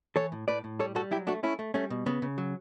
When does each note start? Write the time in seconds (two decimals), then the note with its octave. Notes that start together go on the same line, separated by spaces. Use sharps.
0.16 E3 A4 C#5
0.32 A2
0.48 A2 B4 D5
0.64 A2
0.79 G3 A4 C#5
0.95 G3 F#4 A4
1.11 F#3 E4 G4
1.27 A3 D4 F#4
1.43 A3 C#4 E4
1.59 A3
1.74 G3 A3 C#4
1.90 B2
2.06 C#3 B3
2.22 C#3
2.38 F#3